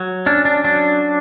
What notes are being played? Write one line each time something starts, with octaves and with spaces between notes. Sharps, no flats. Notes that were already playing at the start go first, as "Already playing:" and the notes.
Already playing: F#3
C#4 D4
D4
F#3 D4